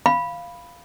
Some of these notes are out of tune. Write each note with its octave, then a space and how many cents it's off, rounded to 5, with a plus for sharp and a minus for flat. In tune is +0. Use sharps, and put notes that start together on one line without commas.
F5 -5 B5 +0